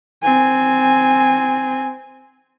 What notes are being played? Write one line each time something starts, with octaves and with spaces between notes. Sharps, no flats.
C4 G#5